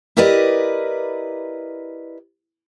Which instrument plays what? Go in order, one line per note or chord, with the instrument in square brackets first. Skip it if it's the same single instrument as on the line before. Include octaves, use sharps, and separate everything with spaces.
[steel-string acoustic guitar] E4 G4 A#4 B4 D5 D#5